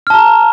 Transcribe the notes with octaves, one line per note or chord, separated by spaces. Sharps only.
A5 A#5 F6